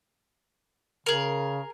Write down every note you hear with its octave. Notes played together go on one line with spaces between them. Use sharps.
C#3 G#4 A#4